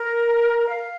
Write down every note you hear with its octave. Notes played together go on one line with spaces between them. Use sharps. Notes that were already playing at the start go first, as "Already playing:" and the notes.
Already playing: A#4
F5